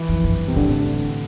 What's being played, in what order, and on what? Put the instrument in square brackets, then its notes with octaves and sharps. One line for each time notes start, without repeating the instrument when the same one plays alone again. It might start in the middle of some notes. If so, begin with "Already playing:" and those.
Already playing: [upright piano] E3
[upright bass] F2
G2
[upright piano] C3
[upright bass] A2 [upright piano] D3